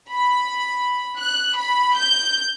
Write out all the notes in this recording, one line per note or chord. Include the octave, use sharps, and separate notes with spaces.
B5
F#6
B5
G6